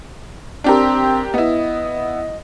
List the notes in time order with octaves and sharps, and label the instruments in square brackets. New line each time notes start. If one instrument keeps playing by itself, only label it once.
[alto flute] C4 [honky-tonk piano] D4 G4 A#4
[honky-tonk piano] B3 E4 [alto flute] D#5